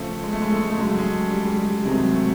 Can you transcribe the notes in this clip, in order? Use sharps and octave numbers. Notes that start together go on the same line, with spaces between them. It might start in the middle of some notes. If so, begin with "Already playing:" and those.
Already playing: C#3 F3 A3
G#3
A3
G#3
A3
G#3
A3
C#3 F#3 G#3
A3
G#3
G3
G#3
G3
C3 D#3 F#3 G#3
A3